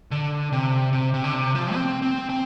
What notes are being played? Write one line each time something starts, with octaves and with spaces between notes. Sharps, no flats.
D3
C3
C3
C3
D3
C3
F3
C4
C4
C4